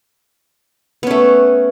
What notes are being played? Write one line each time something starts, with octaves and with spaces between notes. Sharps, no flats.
A3 B3 C#4